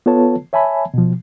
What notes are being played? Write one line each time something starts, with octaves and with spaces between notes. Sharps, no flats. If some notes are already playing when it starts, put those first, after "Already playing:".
B3 F4 A4 B4 C#5 A5
C#5 E5 G#5 A5 B5
B2 F3